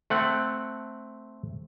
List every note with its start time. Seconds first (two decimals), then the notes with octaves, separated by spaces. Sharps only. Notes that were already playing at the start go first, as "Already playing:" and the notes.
0.10 A3 C4 F#5